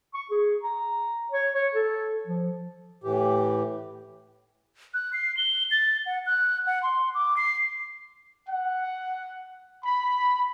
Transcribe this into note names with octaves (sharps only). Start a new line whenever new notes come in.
C#6
G#4
A#5
C#5
C#5
A4
F3
A2 E3 G4
F#6
C7
G7
A6
F#5
F#6
F#5
C6
D6
C7
F#5
B5